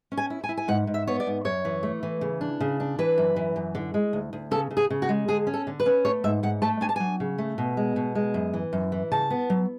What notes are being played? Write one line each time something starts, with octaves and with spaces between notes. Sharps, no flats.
C#4
G#5
E4
G#5
E4
G#5
G#2 F#5
G#2
E5
B3 C#5
D5
G#2
F#2 C#5
E3
A3
E3
C#3
D4
C#3
D4
E3 B4
F#2
E3
F#2
D3
G#3
D2
D2
C#3 A4
C#3
G#4
C#3
F#4
G#3
D3 G#4
C#4
A4
D3
B4
C#4
A3 C#5
G#2 E5
G#2 F#5
A3 A5
D4 G#5
A5
F#3 G#5
C#3
A3
B2
G#3
B2
G#3
F#2
E3
F#2
E3
C#3 A5
B3
F#3